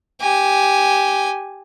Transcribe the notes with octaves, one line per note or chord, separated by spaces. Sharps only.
G4 G#5